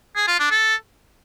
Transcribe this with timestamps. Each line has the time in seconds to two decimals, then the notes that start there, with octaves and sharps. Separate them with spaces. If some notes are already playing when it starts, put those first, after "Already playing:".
0.16 G#4
0.28 F4
0.39 D4
0.51 A4